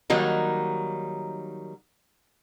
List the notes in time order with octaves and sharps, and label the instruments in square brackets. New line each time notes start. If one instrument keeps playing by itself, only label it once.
[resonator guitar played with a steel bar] D#3 F#3 G3 A#3 D#4